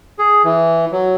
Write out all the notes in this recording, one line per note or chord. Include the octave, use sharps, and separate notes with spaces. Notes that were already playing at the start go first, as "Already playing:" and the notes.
G#4
E3
F#3